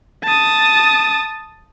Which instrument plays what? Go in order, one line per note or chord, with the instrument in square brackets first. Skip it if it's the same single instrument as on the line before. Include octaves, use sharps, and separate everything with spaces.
[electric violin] A5 D#6